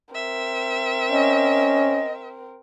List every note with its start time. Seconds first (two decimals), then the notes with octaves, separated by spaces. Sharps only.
0.15 C4 A#4 E5
1.11 C#4 D#5